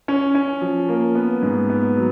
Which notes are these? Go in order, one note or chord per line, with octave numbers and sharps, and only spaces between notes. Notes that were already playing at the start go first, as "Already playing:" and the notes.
C#4
C#4
F3
A#3
B3
G#2
B3
F#3